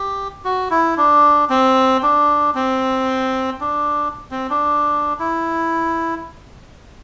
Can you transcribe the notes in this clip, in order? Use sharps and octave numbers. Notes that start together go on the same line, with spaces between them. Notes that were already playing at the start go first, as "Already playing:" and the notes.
Already playing: G4
F#4
E4
D4
C4
D4
C4
D4
C4
D4
E4